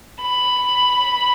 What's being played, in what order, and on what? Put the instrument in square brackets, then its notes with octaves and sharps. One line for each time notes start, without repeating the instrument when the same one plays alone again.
[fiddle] B5